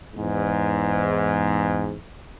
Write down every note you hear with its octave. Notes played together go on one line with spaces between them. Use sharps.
E2 G#2